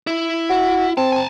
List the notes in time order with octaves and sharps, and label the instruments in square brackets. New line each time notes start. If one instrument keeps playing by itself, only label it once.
[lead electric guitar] E4
[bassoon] F#4
[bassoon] C4 [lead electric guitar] A5
[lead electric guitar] G#5 A5